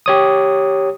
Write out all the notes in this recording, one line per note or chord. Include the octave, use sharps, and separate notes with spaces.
G4 C#5 D#6